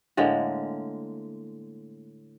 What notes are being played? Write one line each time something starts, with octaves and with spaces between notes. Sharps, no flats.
A2 D3 G#3 A#3